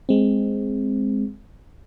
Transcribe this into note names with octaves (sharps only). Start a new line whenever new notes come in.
G#3 C4